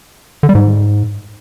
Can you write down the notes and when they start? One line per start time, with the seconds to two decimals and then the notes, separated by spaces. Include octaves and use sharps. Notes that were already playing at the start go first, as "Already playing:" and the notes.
0.43 D3
0.49 G3
0.55 G#2